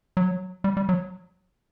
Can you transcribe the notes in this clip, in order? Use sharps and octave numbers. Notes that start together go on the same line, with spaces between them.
F#3
G3
G3
F#3